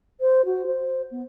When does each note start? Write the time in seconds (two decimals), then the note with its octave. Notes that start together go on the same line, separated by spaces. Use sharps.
0.20 C5
0.45 F#4
0.66 C5
1.11 B3